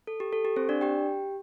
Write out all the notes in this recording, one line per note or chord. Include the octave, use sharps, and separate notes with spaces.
A4
G4
A4
G4
C4 C5
D4 D5
G4 G5